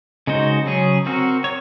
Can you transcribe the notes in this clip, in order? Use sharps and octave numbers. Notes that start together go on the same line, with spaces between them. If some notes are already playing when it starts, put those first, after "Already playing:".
C#3 G#3 D#4 F#4 C5
C#3 F#3 C#4 G#4
C4 F#4 A#4
C#5